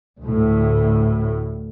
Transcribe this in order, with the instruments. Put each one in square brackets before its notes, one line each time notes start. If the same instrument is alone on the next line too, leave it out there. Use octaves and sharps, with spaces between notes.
[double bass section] D2 A2